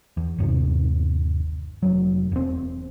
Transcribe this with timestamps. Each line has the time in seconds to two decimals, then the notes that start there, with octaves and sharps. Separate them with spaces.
0.17 E2
0.38 G1 D#2 C3
1.83 F1 F#3
2.32 E1 C4